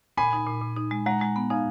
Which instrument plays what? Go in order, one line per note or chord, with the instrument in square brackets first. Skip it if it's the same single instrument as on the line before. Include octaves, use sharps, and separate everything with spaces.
[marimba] A#2 [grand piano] G#5 B5
[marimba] D#4
A#2
A#2
D#4
G#3
[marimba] G#3 [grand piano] F#5 A#5
[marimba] G#3
B3
[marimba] D#4 [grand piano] F5 G#5